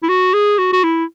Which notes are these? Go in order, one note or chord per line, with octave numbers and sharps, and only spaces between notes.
E4
F#4
G#4
F#4
F#4
E4